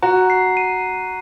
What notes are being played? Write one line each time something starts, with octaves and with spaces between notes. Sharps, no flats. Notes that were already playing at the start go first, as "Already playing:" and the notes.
F#4 A#5
C7
D#7